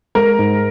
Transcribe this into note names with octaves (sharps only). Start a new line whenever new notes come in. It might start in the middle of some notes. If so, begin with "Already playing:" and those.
G#3 A#4
G#2